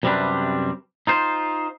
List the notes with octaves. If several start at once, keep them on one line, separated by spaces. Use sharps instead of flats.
F#2 C3 G3 C4 D4 B4
D#4 F4 C5